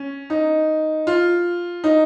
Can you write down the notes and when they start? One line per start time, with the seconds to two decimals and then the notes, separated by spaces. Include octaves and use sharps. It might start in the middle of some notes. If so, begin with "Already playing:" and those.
Already playing: C#4
0.30 D#4
1.07 F4
1.84 D#4